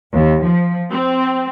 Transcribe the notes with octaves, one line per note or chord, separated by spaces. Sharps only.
D#2
F3
C4